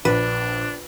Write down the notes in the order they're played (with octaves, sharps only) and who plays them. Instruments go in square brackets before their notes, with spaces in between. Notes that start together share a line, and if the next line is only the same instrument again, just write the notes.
[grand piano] A#1 [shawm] D4 [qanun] B4